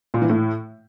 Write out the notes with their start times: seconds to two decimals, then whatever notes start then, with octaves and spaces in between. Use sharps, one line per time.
0.14 A#2
0.22 E3
0.30 A2